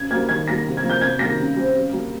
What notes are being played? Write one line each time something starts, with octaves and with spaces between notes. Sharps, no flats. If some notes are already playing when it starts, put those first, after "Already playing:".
Already playing: C#3 G#6
G3 A#3 G#6
D#3 G#6
G3 A#3 A#6
C3
G#6
F3 A#3
G6
C3 G#6
D#3 G3 A#3 A#6
C#3
G3 C4
C#3
G3 A#3